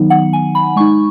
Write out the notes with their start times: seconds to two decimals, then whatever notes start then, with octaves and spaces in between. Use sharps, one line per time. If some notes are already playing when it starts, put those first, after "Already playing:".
Already playing: D#3 F#3 B3 D#4
0.10 F#5
0.33 G#5
0.55 B5
0.76 G#3 D#4 C#6